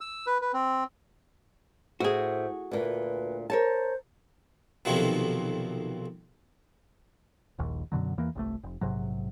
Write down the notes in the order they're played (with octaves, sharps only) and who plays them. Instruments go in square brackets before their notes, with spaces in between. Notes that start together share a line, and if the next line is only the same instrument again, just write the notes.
[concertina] E6
B4
B4
C4
[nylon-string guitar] A2 [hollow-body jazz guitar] F#4 G#4 [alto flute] C5
[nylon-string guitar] D2 A#2 A3 [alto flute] B4
[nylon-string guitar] A#4 C#5 A5 [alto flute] C5
[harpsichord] B1 F2 C3 D#3 F3 F#3
[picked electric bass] D#1 A#1 D#2
F#2 B2 D3 F#3
E2 E3 A#3
G1 C2 A3
F1
A#1 G#2 C3 F#3